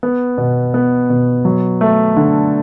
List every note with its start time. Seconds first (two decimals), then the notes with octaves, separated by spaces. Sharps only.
0.03 B3
0.38 B2
0.74 B3
1.10 B2
1.45 F#3
1.81 A3
2.17 D3